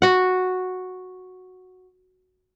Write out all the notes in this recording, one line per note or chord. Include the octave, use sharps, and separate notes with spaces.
F#4 F#5